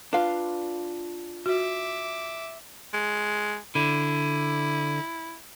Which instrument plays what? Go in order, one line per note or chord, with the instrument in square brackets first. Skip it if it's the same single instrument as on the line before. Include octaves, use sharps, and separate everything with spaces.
[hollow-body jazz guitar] D4 F4 [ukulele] B4 F5
[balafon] F#4 [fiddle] E5 D6
[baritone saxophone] G#3
[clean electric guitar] D3 [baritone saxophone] E4